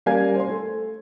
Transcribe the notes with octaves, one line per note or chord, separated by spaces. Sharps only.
G3 A#3 C#4 F5 G#5 G#6
C5 C6
A3